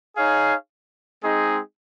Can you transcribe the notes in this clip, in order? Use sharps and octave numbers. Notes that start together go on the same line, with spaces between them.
D#4 G#4 C#5 F5
G#3 C4 D#4 G#4